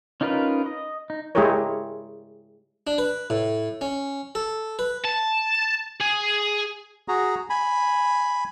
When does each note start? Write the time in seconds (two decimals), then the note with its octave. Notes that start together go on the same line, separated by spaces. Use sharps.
0.21 C#4 D#4 F4 A#4 B4
0.66 D#5
1.10 D#4
1.35 G#3 E4 G4 G#4 A#4 C#5
2.87 D4
2.98 B4
3.30 A2
3.81 C#4
4.35 A4
4.79 B4
5.04 A5
6.00 G#4
7.08 F#4 G#4 A#5
7.50 G#5 B5